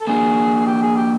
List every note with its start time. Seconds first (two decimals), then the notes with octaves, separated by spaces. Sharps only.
0.01 A4
0.07 A#3 D4 F#4 G#4
0.67 G4
0.82 G#4
0.96 G4